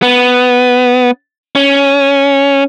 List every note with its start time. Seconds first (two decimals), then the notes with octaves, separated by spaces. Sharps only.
0.02 B3
1.55 C#4